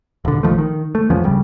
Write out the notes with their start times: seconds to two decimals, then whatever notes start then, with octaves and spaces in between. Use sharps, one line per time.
0.25 D#1 D3
0.43 A#1 D#3 F3 A3
0.58 D#3
0.95 A3
1.10 E2 F3 B3 C#4
1.23 D1 G1 C#3 G3